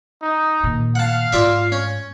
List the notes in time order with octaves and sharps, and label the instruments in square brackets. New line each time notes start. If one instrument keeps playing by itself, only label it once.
[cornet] D#4
[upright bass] A#2 D#3
[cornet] F5 [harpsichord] F#5 A5
[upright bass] G#2 [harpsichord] F4 D5 E5
[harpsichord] C#4